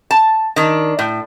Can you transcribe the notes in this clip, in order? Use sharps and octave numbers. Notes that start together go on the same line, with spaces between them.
A5
D#3 D4
A2